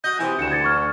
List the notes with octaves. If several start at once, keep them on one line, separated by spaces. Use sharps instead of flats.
F#4 D#5 G6
C3 E3
D2 C#7 E7
G#6 A6 C#7
C#6 F6